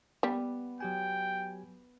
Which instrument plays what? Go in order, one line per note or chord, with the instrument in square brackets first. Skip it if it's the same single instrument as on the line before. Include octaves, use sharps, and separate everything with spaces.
[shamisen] G3 [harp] B3
[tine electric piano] F#3 G4 G#5 [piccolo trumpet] G5